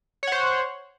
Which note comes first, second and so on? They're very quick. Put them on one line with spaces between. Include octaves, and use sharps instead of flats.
C#5 F#5 C5